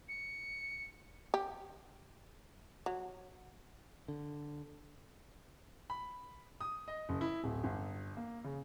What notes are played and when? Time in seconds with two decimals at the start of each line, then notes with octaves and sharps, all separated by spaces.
0.09 C#7
1.34 G4
2.86 F#3
4.08 D3
5.90 B5
6.61 D#6
6.88 D#5
7.09 F#1
7.21 E4
7.44 D1
7.64 G1
8.17 A#3
8.44 C#3